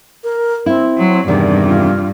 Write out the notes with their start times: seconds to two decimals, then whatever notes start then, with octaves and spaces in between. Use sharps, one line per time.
0.24 A#4
0.66 C4 E4
0.98 F#3
1.28 E2 G2 C3 D#3 D5
1.66 F4